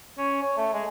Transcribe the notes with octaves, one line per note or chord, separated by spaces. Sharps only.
C#4
C#5
A3
G#3